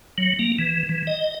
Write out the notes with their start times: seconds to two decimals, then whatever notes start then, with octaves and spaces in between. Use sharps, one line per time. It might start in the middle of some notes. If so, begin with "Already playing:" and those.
0.18 F#3
0.39 A#3
0.59 E3
0.89 E3
1.07 D#5